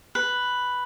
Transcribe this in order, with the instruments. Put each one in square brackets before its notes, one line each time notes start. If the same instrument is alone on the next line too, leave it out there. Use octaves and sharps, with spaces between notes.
[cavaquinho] B4